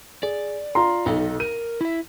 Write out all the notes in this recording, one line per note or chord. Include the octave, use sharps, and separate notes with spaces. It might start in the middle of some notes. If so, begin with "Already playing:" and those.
G#4 D5
F4 A#5 C6
B1 D#4 A4 D#5
A#4 D#7
E4 E5